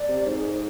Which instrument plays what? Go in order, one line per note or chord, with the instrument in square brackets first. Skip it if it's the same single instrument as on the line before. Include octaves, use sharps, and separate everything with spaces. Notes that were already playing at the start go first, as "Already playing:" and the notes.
Already playing: [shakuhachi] D5
[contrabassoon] C3
[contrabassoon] G#2 [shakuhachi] C5
[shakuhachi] G#4
C5